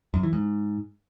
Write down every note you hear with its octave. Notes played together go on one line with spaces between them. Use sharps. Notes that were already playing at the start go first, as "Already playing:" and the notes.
F#2
E3
G#2